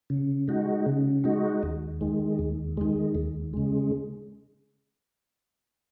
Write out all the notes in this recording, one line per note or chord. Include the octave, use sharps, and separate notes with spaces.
C#3
G#3 D#4 F#4
C#3
G#3 D#4 F#4
D#2
D#3 G#3
D#2
D#3 G#3
D#2
C#3 G#3